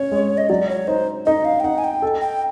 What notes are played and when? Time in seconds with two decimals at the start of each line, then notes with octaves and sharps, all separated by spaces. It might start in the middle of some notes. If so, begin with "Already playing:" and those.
Already playing: C#4 C#5
0.12 G#3
0.38 D#5
0.49 F#3 D5
0.69 C#5
0.87 D#4 C5
1.26 D#4 D#5
1.45 F5
1.60 G5
1.64 D#4 F#5
1.78 G#5
1.84 G5
2.02 A4
2.21 G5